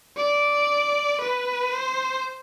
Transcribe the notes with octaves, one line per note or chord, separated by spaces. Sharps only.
D5
B4
C5